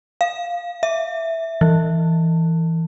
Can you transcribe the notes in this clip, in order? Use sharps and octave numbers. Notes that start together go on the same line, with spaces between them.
F5
E5
E3